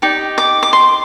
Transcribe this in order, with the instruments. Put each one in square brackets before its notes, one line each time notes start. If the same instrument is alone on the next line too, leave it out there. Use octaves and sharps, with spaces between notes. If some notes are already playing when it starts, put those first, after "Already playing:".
[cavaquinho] D#4 G4 D5
D6
D6
C6